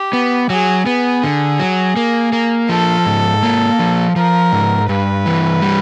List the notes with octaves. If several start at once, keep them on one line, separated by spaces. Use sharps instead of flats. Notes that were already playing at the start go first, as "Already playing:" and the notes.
Already playing: G4
B3
F#3 G#4
B3 G#4
D3
F#3
A#3
A#3
F3 A4
G#2
A#3
F3
F3 A#4
G#2
G2 B4
E3
G3